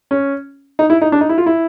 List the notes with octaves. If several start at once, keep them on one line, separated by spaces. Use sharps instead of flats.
C#4
D#4
E4
D#4
D4
D#4
E4
F4
E4